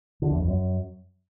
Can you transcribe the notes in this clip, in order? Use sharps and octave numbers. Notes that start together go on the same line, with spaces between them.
D3
E2
F2
F#2